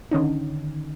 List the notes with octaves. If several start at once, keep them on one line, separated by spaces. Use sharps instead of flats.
D3 D#3 C#4 D#4